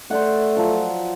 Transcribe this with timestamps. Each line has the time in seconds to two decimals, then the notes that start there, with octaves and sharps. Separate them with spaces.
0.10 A3 C5 D5 F#5
0.56 F3 F#3